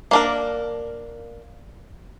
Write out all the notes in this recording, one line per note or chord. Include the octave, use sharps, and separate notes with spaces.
A#3 D4 A#4